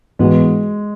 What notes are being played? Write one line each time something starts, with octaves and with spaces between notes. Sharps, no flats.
G#2 E3 G#3 B3 F#4